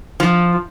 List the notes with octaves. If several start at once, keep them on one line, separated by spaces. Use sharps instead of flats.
F3